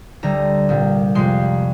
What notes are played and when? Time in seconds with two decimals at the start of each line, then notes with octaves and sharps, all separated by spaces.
0.23 D2 D3 G3 A#5
0.69 C2 A#2 G3
1.15 F2 C3 F3 G#3 C6